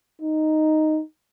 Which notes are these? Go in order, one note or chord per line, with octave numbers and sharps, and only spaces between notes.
D#4